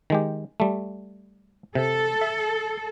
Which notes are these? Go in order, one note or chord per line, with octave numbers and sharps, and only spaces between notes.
D#3 G#3 G4
G3 A3
C3 A4
E5